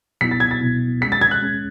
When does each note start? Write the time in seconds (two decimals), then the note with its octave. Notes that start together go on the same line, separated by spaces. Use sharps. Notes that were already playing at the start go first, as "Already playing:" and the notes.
0.21 B2 F#3 B3 E4 B6
0.31 A6
0.40 G#6
0.51 A6
0.61 B2 F#3 B3 E4
1.01 G#3 C#4 G#4 B6
1.12 A6
1.21 G#6
1.31 F#6
1.42 G#3 C#4 G#4